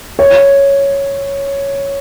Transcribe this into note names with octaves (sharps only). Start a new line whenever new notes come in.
C#5